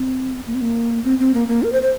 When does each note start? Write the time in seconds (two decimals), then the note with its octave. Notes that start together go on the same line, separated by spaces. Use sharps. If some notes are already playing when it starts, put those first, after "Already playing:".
Already playing: C4
0.47 A#3
0.54 C4
0.61 A#3
1.04 C4
1.19 C4
1.34 A#3
1.48 A#3
1.63 A#4
1.72 C5
1.82 C5